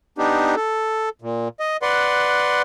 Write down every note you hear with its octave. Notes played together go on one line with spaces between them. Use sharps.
B3 D4 D#4 G4
A4
A#2
D#5
B4 D5 F#5 C6